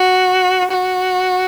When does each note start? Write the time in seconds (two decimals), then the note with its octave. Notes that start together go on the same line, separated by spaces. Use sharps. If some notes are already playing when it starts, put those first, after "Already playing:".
Already playing: F#4
0.71 F#4